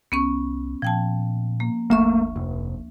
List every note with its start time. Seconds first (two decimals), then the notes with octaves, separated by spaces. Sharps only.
0.12 C2 B3 C#4 C#6
0.82 A#2 F3 G5 A5
1.60 A#3
1.90 F#1 D2 A3 A#3 E5 C#6
2.36 F1